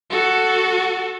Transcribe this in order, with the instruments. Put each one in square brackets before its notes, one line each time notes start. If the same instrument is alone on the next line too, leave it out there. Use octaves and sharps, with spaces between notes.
[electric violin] F#4 A4